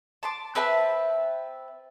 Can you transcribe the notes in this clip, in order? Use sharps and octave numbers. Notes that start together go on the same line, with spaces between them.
A5 C6 D6
C4 B4 E5 A5